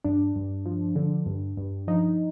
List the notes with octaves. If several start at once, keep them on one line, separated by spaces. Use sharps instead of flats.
G2 D4
G2
F3
D3
G2
G2
F3 D#4